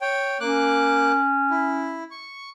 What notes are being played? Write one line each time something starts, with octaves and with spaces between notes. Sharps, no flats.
C#5 G5
A#3 C#4 D6 F#6
E4
C#6